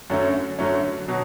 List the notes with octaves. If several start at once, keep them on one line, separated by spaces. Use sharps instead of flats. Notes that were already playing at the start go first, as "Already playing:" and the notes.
F#2 D3 F#3 A3 C#4
F#2 D3 F#3 A3 C#4
B2 F#3